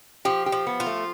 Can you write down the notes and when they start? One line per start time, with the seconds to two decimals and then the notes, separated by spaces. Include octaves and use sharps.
0.25 F3 G4
0.46 G4
0.52 F3
0.67 B3
0.80 F4
0.86 A3